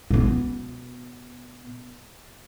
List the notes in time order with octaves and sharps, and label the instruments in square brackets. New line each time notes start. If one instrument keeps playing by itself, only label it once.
[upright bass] B2 B3